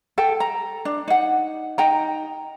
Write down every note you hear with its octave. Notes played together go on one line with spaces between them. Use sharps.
A4 G5
A#5
D4
D#4 F#5
D#4 G5 A#5